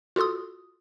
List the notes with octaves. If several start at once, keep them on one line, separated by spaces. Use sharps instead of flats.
F4 F#4 A4 C6 D#6